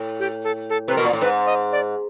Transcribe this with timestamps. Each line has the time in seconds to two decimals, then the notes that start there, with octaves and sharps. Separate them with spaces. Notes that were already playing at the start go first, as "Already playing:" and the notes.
Already playing: A2
0.19 G4
0.44 A4
0.70 A4
0.88 C3 B4
0.95 B2 A#4
1.05 A#2
1.13 A2
1.21 G#2 B4
1.46 D#5
1.72 D5